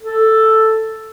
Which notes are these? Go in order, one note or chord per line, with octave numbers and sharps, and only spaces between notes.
A4